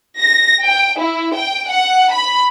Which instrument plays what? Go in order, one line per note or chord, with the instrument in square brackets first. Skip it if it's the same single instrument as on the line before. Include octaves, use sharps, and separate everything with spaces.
[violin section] A#6
G5
E4
G5
F#5
B5